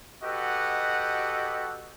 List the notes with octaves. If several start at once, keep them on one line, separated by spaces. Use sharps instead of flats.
F#4 G4 A4 B4 D#5 F#5